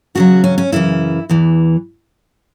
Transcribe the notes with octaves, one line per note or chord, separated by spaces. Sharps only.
E2 C#3 F#3 F#4
C#4
C#4
F#2 C#3 E3 E4
E2 E3